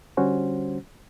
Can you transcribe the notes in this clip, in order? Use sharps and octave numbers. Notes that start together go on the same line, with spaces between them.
D3 G3 C#4 F#4 C5